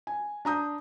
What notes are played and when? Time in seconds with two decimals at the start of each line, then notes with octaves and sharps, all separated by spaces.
0.07 G#5
0.45 D4 A#5 D#6 G6